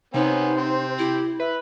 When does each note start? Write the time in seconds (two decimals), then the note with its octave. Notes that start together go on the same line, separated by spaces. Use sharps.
0.14 C3 B3 C#4 D#4 C5
0.58 C4
0.98 E4 G4
1.40 B4 E5